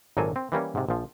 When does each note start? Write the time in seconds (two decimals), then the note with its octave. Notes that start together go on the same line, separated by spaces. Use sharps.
0.17 G#1 A#2 F#3 A#3 A4 G#5
0.36 C4
0.52 E3 G3 A#3 C#4
0.75 G#2 C3
0.89 A#1 F3